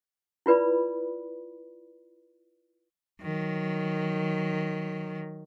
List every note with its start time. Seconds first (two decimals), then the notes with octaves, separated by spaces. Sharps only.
0.46 E4 F4 B4 D5 B5
3.22 D#3 F#3